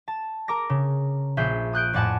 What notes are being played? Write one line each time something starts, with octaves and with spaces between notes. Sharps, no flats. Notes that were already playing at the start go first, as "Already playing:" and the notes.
A5
A#4 A#5 D6 A#6
C#3
A#1 G#4 E5 G6 C7
D#6 F#6 G6 D7
F2 A2 D5 F#5 G#5 A5